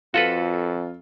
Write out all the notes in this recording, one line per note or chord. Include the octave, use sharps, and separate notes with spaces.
F2 F4 F#4 A4 B4